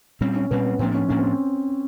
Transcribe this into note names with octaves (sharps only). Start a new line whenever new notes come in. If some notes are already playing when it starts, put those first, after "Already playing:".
A#2 G3 C4 C#4
C#4
A#2 G3 B3 C4
B3
A2 F3 A#3 C4 D4
C#4
A2 F3 A#3 C#4 D4
C4